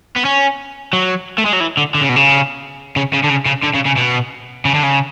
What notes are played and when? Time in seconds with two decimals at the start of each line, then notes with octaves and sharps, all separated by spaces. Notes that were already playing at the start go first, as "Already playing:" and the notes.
0.16 B3
0.25 C#4
0.93 F#3
1.38 A3
1.46 G#3
1.53 F#3
1.61 E3
1.77 D3
1.95 D3
2.01 C#3
2.09 B2
2.16 C#3
2.96 C#3
3.14 C#3
3.24 D3
3.30 C#3
3.46 C#3
3.64 D3
3.75 C#3
3.86 C#3
3.97 B2
4.65 C#3
4.74 D3
4.83 C#3